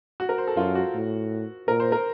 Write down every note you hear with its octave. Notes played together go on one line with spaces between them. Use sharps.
F#4
A#4
C5
A4
F#2 F4
F#4
A2
A#2 A#4
C5
A#4